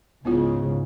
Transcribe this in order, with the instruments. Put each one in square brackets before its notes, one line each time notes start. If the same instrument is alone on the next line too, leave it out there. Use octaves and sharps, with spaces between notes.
[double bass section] C#2 G#2 C#3 [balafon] B3 E4 F4